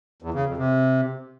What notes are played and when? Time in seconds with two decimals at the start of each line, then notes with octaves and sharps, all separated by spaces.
0.22 E2
0.34 C#3
0.46 F2
0.57 C3